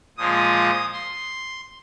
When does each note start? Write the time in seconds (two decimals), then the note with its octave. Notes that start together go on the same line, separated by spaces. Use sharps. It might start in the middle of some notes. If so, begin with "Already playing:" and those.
0.17 A#2 F3 G#3 F4 D#6
0.93 C6